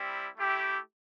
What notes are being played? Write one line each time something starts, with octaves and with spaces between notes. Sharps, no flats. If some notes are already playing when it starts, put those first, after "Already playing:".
Already playing: G3 C4 E4
A3 E4 G4